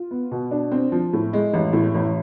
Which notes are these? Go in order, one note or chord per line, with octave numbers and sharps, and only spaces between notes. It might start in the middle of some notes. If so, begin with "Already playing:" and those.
Already playing: F4
B3
B2
D4
C4
F3
A2
G#3
A1
A2
A1